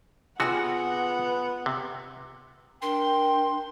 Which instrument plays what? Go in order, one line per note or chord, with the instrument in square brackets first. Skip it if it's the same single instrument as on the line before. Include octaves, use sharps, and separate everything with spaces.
[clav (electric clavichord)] C3 F#4 [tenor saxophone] B3 [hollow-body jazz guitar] F4 G#4 [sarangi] F#5
[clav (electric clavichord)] C3
[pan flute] D4 [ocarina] A#4 [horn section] G5 [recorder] C6